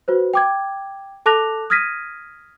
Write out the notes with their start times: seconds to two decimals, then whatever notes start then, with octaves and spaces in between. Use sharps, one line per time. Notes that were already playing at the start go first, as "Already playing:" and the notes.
0.08 F#4 B4 C5
0.34 G5 D6 G#6
1.26 A4 A5 D6 F#6 A#6 F7
1.70 D#6 F6 G#6 A#6 B6 D#7